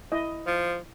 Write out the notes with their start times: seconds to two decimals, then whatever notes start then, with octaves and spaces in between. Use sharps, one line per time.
0.12 E4 D#5
0.47 F3